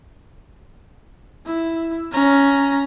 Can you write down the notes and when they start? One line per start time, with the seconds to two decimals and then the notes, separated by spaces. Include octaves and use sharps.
1.46 E4
2.12 C#4 A#5